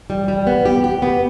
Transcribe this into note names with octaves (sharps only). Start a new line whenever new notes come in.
G3
G3
B3
G4
G4
B3